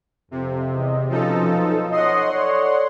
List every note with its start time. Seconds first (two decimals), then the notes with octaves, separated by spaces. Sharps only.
0.31 F2 C3
0.75 E2 D#5
1.09 B2 F3 C#4 D#4 A4 D#5
1.54 B1
1.92 C#5 D#5 F#5 C6
2.32 A4 C#5 D5